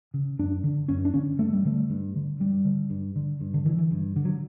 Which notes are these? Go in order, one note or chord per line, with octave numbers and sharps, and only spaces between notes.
C#3
F#2 D4
D3
F#2 C#4
D4
D3 C#4
G2 A3
G3
D3 A3
G2
D3
G2 G3
D3
G2
D3
G2
D3
D3 E3
E3
G2
D3
F#3